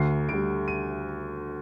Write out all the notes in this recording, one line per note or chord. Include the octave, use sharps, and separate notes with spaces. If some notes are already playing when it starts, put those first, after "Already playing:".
Already playing: D2 C7
D3 G3 D7
D#7